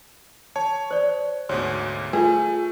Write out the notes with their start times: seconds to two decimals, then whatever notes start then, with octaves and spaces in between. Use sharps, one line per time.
0.56 C#5 A5
0.91 C5 D5
1.49 D2 G#2 B2 F#4 C#5 C6
2.13 A3 F4 G#4 B4